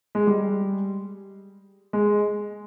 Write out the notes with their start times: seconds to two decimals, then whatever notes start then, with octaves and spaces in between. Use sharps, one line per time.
0.15 G#3
0.27 G3
1.93 G#3